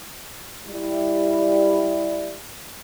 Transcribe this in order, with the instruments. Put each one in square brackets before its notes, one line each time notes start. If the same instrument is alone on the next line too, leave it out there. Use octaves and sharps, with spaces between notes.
[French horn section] G3 E4